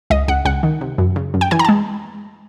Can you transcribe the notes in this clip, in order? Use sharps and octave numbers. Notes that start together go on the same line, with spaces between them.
C#2 D#5
C#2 F#5
C#2 F#5
D#3
C3
F#2
C#3
F#2
G5
E3 G#5
A#5
G#3 A5